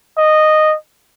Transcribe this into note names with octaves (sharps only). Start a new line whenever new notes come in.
D#5